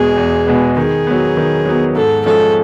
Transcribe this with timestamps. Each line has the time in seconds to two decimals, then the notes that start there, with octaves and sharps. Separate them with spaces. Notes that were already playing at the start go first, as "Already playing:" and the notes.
Already playing: E2 B2 G#3 B3 G#4
0.17 E2
0.47 B2 G#3 B3
0.77 D#3 G#4
1.07 F#3 B3
1.37 D#3
1.66 F#3 B3
1.95 G#2 A4
2.26 F3 G#3 C#4 A4